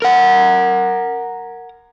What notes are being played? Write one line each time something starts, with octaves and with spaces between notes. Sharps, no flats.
A#4 F#5